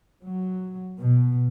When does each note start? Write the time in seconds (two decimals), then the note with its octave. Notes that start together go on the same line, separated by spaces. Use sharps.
0.24 F#3
0.98 B2